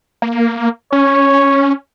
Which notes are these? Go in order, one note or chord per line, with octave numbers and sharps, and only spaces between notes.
A#3
C#4 C#5